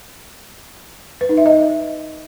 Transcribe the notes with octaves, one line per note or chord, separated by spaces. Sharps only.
B4
D#4
E5
D#5